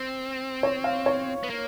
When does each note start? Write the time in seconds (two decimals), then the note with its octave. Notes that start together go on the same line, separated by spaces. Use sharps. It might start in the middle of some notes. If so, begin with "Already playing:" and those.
Already playing: C4
0.63 C#5
0.84 F5
1.06 C#5
1.43 B3
1.50 A#3